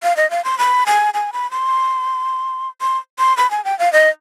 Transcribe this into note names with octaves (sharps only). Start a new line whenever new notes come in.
F5
D#5
F5
C6
B5
G#5
G#5
B5
C6
C6
C6
B5
G#5
G5
F5
D#5